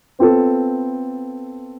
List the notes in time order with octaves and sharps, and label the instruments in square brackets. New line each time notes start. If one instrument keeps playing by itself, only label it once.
[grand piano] B3 C4 F4 A4